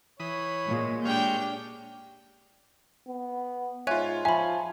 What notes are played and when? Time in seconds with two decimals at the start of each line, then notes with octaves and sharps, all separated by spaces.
0.20 E3 C#5 B5 D#6
0.67 A#2 G#3
1.05 G#3 D4 G4 C#5 G5 F6 G6
3.08 B3
3.87 G#2 F4 C#5 E5 G#5 F#6
4.25 F3 E5 G#5 B5